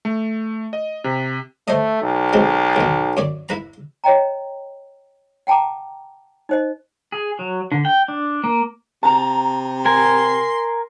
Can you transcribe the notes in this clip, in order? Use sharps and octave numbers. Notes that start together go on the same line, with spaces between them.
A3
D#5
C3
A3 C5 C#5 D#5
B1
F#3 G#3 C4
D#2 B2
F#2 C#5 D5
E4 B4 A#5
C#5 D#5 G5 A#5
F#5 G5 A5 A#5 D6
D#4 C5 D#5
G#4
F#3
D3
G5
D4
A#3
C3 A5 A#5
A#4 G#5 C6